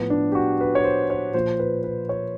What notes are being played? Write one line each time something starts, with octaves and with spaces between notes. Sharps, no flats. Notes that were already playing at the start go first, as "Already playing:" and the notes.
Already playing: A2 F3 B3
D4
G4
F#4
B4
C#5
C5
C#5
A#2 F3 C5
B4
B4
C#5